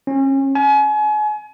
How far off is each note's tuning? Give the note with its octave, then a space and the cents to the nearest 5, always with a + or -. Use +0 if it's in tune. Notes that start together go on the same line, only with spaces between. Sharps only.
C#4 -30
G#5 +35